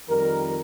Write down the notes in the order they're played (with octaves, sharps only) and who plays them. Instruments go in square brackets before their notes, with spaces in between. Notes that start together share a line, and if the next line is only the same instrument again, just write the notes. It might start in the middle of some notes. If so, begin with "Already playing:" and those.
[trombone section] F2 D#3 G3 A#4